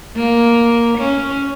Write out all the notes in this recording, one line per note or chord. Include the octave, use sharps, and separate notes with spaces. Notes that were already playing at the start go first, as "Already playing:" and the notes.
A#3
C#4